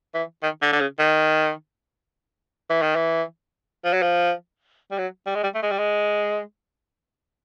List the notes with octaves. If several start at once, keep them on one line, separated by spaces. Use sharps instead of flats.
E3
D#3
D3
D3
C#3
D#3
E3
D#3
E3
F3
F#3
F3
G3
F#3
G3
G#3
G3
A3
G#3
G3
G#3